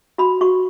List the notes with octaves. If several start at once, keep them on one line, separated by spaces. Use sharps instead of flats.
F#4 B5
F#4 C#6